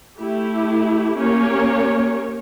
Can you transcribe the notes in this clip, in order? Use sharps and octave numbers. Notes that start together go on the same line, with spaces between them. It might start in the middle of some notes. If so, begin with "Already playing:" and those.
A3 E4 G4
A#3 C#4 G4 A#4 C#5